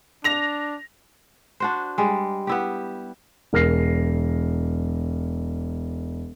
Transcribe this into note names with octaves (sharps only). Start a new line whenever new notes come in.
D4 A#6 F7
D4 F#4 C5
G3 G#3
B3 E4 G4
E1 A#4 F6 A#6 C7